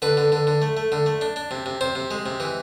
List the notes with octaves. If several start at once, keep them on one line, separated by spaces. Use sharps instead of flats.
D3 B4
D3
D3
D3
A3
A3
D3
A3
D4
D4
C3
C3
C3 C5
C3
G#3
C3
E3